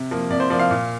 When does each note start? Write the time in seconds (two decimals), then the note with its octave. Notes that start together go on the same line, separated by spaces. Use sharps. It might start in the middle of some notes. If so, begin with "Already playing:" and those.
Already playing: C3
0.11 F3 A#3
0.30 C3 D5
0.40 C5
0.50 F3 A#3 D5
0.60 F5
0.70 A#2